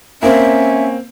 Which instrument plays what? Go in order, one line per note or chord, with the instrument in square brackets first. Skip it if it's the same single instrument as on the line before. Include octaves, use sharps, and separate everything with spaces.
[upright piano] A#3 C4 [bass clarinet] C#4 [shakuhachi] E5